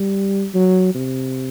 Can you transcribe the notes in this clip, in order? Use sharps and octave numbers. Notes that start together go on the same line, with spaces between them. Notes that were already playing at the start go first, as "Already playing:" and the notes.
Already playing: G3
F#3
C3